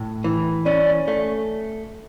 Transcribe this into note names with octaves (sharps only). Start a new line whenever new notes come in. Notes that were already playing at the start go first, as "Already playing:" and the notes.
Already playing: A2
E3
C#4 D5
A3